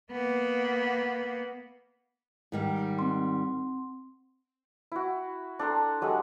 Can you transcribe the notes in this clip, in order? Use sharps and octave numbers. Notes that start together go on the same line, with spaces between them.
A#3 B3
G#2 D#3 G3
C4 C6
E4 F#4
D4 A4 A#5 C6
F#3 G#3 G4 A4